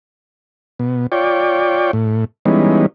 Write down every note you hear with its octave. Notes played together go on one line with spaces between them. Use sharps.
B2
F4 C#5 D5 G5
A2
E3 G3 G#3 B3 C#4 D#4